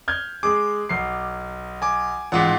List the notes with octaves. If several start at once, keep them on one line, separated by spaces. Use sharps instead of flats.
F6 G6 G#6
G#3 G#4 D6
B1 C7
G#5 D6
A1 G#2 F4 F#5